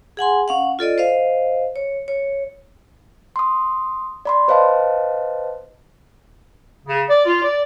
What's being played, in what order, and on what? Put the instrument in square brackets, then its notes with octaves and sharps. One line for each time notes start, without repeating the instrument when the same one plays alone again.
[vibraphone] G#4 F#5 G#5 C6
C#4 F5 F#5
F4 A4 D5 D#5
C5 D#5 F5
C#5
C#5
[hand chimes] C6 D#6
D5 B5 C6
B4 C5 D#5 F5 A5
[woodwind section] C#3
D5
F4
D5